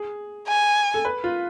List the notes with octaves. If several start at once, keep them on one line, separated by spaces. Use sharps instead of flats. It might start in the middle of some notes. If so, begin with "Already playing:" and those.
Already playing: G#4
G#5
A4
B4
F4